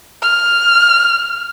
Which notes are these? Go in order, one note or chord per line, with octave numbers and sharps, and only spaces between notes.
F6